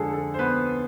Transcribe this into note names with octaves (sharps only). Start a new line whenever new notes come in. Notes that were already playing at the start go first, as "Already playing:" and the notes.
Already playing: F2 D3 G#3 G#4 A4
A4
C5
B3 B4